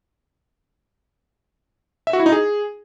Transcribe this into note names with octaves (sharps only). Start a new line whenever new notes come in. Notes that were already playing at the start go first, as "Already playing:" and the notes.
E5
F#4
E4
D#4
G#4